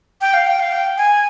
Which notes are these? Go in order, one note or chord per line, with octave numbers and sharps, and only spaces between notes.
G5
F5
G5
F5
G5
G#5